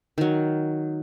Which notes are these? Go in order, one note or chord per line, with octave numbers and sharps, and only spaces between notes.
D#3 F#3